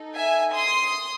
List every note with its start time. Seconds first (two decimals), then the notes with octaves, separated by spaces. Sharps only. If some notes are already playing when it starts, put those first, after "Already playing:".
Already playing: D#4 A4
0.16 E5 G#5
0.54 C6 D#6